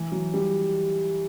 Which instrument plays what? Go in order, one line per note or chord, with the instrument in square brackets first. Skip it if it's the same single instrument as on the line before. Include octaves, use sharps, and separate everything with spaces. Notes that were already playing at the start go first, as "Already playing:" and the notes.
Already playing: [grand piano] E3
F#3
G3